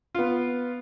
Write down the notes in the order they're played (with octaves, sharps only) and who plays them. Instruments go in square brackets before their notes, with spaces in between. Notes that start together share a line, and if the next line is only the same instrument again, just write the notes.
[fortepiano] B3 F4